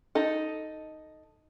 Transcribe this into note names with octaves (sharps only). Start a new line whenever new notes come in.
D#4 A4